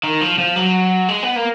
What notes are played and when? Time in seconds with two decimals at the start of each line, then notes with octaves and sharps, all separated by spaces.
0.03 D#3
0.21 F3
0.38 F3
0.56 F#3
1.09 G#3
1.23 B3
1.36 A#3